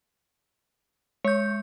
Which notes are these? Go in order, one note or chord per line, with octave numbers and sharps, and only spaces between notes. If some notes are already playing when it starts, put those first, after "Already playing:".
G#3 C#5 G6